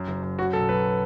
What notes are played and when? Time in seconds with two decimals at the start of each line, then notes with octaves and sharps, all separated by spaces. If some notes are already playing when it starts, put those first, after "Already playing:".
Already playing: F#2
0.08 F#1
0.22 F#2
0.39 F#3 F#4
0.53 B1 A4
0.69 F#3 B4